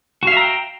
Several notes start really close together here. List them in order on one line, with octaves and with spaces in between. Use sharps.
F#4 F5 E5 A#5 G5